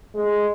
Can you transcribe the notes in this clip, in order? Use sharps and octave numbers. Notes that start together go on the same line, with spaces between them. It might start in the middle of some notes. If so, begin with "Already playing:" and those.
G#3